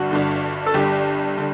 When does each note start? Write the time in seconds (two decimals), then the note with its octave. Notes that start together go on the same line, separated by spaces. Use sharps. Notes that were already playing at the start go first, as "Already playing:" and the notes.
Already playing: G1 G2 D3 F#4
0.11 G1 G2 D3
0.66 A4
0.74 G1 G2 D3 G4
1.38 D3